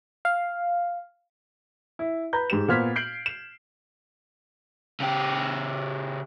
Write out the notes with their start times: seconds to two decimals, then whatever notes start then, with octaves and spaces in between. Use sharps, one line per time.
0.25 F5
1.99 E4
2.33 B4 A#5 G6
2.50 G#2 G4 E7
2.68 A#2 B3 C5 F6 G#6 B6
2.96 G6 C7 D7 F#7
3.26 E7
5.00 C#3 G4